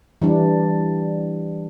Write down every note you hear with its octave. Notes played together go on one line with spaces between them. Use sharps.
E3 G3 D4